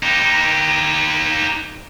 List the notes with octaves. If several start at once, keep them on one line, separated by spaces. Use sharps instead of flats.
D#4 G4